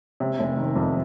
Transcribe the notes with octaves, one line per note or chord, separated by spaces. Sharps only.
C3
F1
D#3
F2